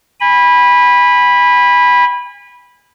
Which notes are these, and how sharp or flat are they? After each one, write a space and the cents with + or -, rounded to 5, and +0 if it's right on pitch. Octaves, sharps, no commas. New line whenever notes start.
G#5 -35 B5 -10